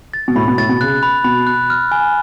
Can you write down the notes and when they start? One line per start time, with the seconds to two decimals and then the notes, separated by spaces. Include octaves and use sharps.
0.14 A6
0.28 B2
0.36 A2 B5
0.48 B2
0.58 A2 A6
0.69 B2
0.81 C#3 F#6
1.03 B5
1.24 B2 B5
1.47 F#6
1.70 F6
1.92 G#5